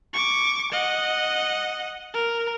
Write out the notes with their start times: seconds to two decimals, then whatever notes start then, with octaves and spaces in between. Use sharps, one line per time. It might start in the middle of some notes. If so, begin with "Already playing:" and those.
0.14 C#6 D6
0.72 D#5 F#5
2.14 A#4